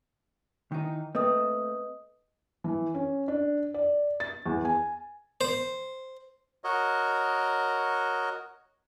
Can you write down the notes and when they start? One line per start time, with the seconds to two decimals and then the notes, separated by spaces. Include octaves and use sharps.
0.72 D#3 E3 D#4
1.15 A3 A#3 C4 B4 D#5 D#6
2.64 E3
2.95 C#4
3.28 D4
3.74 D5
4.20 A6
4.46 E2
4.65 G#5
5.41 C5
6.64 F#4 A#4 C#5 D#5